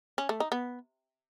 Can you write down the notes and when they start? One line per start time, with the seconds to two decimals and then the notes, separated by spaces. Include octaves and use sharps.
0.18 C#4
0.29 A3
0.40 D#4
0.52 B3